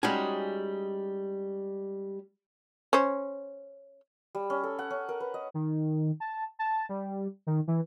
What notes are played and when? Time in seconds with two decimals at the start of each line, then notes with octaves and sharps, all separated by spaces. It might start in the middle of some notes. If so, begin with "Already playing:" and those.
0.03 G3 G#3 C#4 D#4 F#4 G#4
2.93 C#4 C5
4.35 G3
4.50 C#4
4.64 A4
4.79 F#5
4.90 C#4
5.09 A#4
5.20 B4
5.34 D#5
5.54 D#3
6.20 A5
6.59 A5
6.89 G3
7.47 D#3
7.68 E3